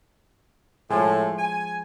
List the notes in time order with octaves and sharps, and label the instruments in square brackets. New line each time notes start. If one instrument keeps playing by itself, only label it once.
[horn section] A2 [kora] F3 G#3
[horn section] G#5